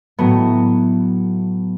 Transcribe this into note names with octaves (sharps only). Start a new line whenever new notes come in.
A2 F#3 A3 B3